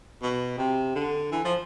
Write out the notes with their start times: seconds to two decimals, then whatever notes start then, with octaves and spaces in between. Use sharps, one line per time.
0.23 B2
0.58 C3
0.96 D3
1.32 E3
1.45 F3